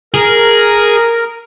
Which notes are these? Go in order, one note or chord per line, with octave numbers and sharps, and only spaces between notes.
G#4 A#4